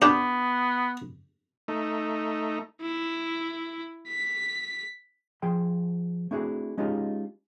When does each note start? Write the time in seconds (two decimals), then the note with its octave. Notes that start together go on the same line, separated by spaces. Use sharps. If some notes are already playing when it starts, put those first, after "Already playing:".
0.02 B3 D4 G4 G5
1.68 A3 D#4
2.82 E4
4.08 B6
5.42 F3 G#4 G5 C6
6.31 A3 C4 D4 E4 F#4 G#4
6.78 G#3 C#4 D#4 F4 G4 G#4